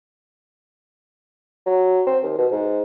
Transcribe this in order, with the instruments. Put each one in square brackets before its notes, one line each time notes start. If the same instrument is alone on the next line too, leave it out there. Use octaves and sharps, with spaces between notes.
[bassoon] F#3
C4
D#2
B2
G#2